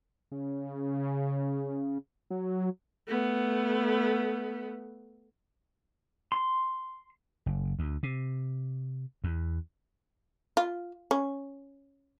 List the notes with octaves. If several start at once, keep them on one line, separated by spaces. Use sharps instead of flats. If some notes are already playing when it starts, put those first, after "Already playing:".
C#3
F#3
A3 B3
C6
F#1
D2
C3
E2
F4
C#4